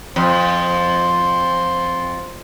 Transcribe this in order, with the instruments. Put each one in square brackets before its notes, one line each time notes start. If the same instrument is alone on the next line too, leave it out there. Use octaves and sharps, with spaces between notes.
[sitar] F2 [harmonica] C5